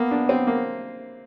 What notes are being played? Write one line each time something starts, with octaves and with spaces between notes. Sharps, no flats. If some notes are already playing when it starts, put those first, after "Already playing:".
Already playing: A#3 B3
D4
C4
A#3